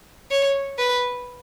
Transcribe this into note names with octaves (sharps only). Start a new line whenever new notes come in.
C#5
B4